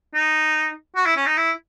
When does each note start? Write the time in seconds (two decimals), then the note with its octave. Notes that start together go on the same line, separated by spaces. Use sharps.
0.15 D#4
0.96 F#4
1.06 E4
1.16 C#4
1.26 D#4
1.37 E4